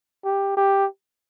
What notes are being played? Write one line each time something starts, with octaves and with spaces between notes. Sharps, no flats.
G4
G4